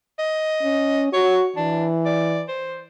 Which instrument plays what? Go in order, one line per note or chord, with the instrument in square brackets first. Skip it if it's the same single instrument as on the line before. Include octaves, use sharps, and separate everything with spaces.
[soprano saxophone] D#5
[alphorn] C#4
[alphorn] F#4 [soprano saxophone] C#5
[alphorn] E3 [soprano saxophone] D4
[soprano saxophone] D5
C5